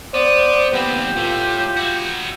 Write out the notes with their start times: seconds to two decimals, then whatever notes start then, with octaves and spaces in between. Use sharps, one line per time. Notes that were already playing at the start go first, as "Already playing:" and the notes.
0.14 B3 C5 D5
0.73 D#2 B3 C4 G4
1.17 A2 A3 F4
1.77 E4 F#4